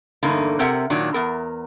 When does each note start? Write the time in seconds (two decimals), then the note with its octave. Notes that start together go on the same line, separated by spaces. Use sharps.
0.23 E2 G2 D3 A#3 D#4
0.59 C3 C4 A#4 E5 F#5
0.90 A#2 D#3 F#3 D4
1.14 E2 B3 A#4